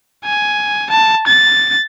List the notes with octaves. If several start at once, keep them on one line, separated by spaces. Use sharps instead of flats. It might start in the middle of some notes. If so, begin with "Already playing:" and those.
G#5
A5
A6